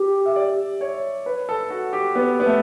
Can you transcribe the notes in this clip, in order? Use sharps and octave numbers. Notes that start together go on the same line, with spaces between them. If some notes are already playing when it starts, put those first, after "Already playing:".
Already playing: G4
E5
D5
C#5
B4
A4
F#4
G4
B3
B3
A3